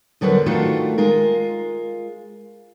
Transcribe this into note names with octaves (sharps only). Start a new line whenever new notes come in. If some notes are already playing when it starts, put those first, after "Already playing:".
E2 D3 F#3 G3 A#4 B4
D#3 A3 D4 F4 F#4 A4
G#3 F4 A#4